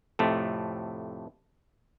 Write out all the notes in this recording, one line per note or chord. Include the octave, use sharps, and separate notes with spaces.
F2 A2 C3 A3